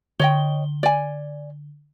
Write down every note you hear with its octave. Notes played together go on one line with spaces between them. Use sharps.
D3 C#5 D#5 G5 G7
D5 G#5